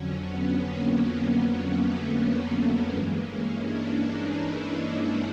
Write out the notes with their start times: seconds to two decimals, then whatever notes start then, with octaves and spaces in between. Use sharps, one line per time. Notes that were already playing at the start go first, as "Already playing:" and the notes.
Already playing: F2 D3 F#3 C#4
0.27 B3
0.64 A#3
1.02 B3
1.39 A#3
1.77 A3
2.89 G2 E3 G#3 A#3
3.27 C#4
3.65 D4
4.03 D#4
4.40 E4
4.78 D#4